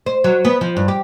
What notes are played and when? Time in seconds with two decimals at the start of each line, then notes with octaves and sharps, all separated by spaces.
0.06 C5
0.24 F#3
0.45 B3
0.61 F3
0.77 G2
0.88 G4